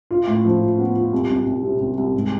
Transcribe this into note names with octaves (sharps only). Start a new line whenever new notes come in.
F4
A2
F3
F4
B3
F4
C2
C2
C2
C3
C2
C2
G#2